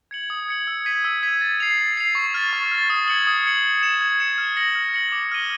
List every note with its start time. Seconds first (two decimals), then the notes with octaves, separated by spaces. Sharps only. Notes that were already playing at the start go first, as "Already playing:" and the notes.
0.11 G#6 C#7 F#7
0.30 D#6
0.49 G#6 C#7 F#7
0.67 E6
0.85 G#6 B6 D#7
1.04 E6
1.23 G#6 B6 D#7
1.41 A6
1.60 C7 F7
1.78 A6
1.97 C7 F7
2.15 C#6
2.34 F6 A6
2.53 C#6
2.72 F6 A6
2.90 D#6
3.08 G#6 C#7 F#7
3.27 D#6
3.46 G#6 C#7 F#7
3.64 G#6
3.83 C#7 E7
4.01 G#6
4.20 C#7 E7
4.38 F6
4.57 A#6 C#7 F#7
4.75 F6
4.94 A#6 C#7 F#7
5.12 D6
5.32 F6 A#6 D#7 G7